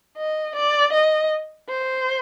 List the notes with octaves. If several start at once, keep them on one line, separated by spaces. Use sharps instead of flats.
D#5
D5
D#5
C5